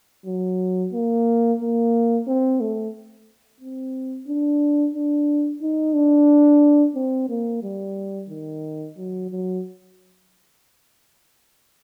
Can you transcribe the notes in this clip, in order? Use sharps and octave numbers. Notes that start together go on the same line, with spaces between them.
F#3
A#3
A#3
C4
A3
C4
D4
D4
D#4
D4
C4
A#3
G3
D#3
F#3
F#3